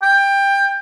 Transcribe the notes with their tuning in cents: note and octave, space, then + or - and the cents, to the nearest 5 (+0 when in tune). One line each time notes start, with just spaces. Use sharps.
G5 +20